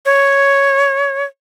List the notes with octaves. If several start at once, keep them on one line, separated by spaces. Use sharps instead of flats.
C#5